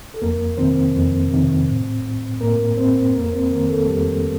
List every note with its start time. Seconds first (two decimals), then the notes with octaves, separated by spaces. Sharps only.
0.14 A4
0.22 F2 A#3 A#4
0.57 C3 D#3 C4 C5
0.95 F2
1.32 C3 D#3
1.68 A2
2.41 A2 A#3 A#4
2.77 C4 C5
3.14 F2 A#3 A#4
3.24 A#4
3.32 C4 C5
3.50 D#3 A#3 A#4
3.69 A3 A4
3.87 F2 G3 G4